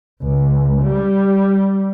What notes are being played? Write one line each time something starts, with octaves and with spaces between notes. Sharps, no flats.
C#2
G3